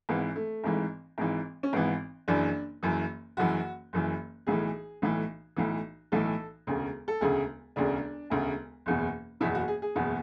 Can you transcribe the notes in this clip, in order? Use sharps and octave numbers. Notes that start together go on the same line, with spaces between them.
G#1 G#2 E3 B3
A3
G#1 G#2 E3
G#1 G#2 E3
C#4
G#1 G#2 E3 B3
F#1 F#2 E3 D4
F#1 F#2 E3
F#1 F#2 E3 F#4
F#1 F#2 E3
B1 A2 E3 G#4
B1 A2 E3
B1 A2 E3
B1 A2 E3 A4
E1 D2 C#3
A4
E1 D2 C#3 G#4
E1 D2 C#3 D4
E1 D2 C#3
F#1 E2 B2
F#1 E2 B2 E4
F#4
G#4
G#4
F#1 E2 B2